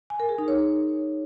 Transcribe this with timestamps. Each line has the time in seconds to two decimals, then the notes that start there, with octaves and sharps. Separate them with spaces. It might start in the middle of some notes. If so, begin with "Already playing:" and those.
0.10 G#5
0.20 A#4
0.29 G#4
0.38 D#4
0.48 C#5